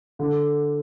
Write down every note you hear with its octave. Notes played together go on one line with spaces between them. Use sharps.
D3